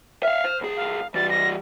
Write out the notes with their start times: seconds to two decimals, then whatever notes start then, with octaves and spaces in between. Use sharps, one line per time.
0.23 E5 F5 F6
0.44 C5
0.61 C2 G#4
0.76 F5
1.14 E3 G3 A6
1.30 A#6